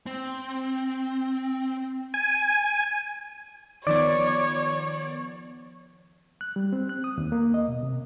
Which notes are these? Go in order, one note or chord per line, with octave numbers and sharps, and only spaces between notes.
C4
G#5
D#3 F3 B3 C#5 D5
F#6
G3
C4
F#6
D#6
D#2
A#3
D#5
B2
C3